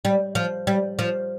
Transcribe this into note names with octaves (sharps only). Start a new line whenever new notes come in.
G3
F3
G3
F3